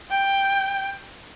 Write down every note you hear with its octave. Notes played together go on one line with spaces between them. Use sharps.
G5